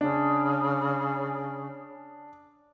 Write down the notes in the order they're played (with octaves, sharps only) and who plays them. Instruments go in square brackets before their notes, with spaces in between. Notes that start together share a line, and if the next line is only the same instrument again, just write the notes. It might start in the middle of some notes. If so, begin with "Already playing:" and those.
[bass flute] C#3 [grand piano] D4